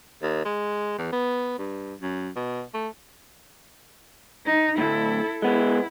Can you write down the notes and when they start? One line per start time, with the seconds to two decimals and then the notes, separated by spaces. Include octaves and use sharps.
0.22 D#2
0.45 G#3
0.98 E2
1.12 B3
1.59 G2
2.01 F#2
2.36 B2
2.74 A3
4.46 D#4
4.78 D2 A2 E4 A4
5.42 G#3 B3 E4